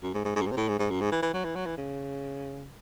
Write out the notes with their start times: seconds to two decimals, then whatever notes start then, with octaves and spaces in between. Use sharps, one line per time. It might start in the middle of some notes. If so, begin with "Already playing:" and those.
0.03 F#2
0.14 G#2
0.25 G#2
0.36 G#2
0.41 F#2
0.46 G#2
0.51 C3
0.57 A2
0.68 G#2
0.79 G#2
0.90 F#2
1.01 G#2
1.12 E3
1.22 E3
1.34 F#3
1.44 E3
1.55 F#3
1.66 E3
1.78 C#3